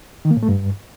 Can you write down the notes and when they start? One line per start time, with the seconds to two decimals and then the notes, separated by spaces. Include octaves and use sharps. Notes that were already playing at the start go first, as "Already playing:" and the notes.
0.25 D#3
0.31 A#3
0.37 A2
0.43 A3
0.49 G2